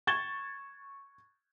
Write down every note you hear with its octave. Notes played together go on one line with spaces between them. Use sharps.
C#6 G#6 A6 E7 G7